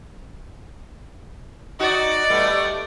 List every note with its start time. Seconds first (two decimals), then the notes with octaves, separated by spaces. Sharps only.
1.79 D#4 F#4 D5
2.30 G3 A3 B3